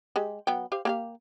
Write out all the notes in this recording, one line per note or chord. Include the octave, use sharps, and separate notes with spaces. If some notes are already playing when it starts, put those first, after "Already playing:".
G#3 G4
F#3 B3 G5
G4 C5 F5
A#3 G4 F5